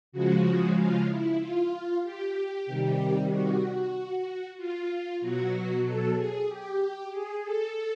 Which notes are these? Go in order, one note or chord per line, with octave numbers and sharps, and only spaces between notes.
C#3 F3 G#3 F#4
F4
E4
F4
G4
C3 D#3 G3
F#4
F4
B2 F#3 F#4
A4
G#4
G4
G#4
A4